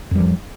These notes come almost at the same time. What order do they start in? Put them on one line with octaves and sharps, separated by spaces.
F2 G3 F3